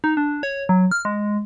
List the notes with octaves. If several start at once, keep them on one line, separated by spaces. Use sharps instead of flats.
D#4
D4
C#5
F#3
F6
G#3